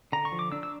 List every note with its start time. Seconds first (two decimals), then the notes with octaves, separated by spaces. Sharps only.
0.12 D3 A#5
0.25 C#6
0.32 F3
0.39 D6
0.52 D4 E6
0.63 E6